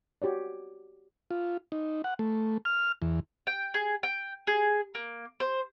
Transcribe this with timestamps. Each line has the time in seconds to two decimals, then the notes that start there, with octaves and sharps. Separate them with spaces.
0.22 F#4 G4 C#5 D5
1.31 F4
1.72 D#4
2.04 F#5
2.19 A3
2.65 F6
3.02 E2
3.47 G5
3.74 G#4
4.03 G5
4.47 G#4
4.95 A#3
5.40 C5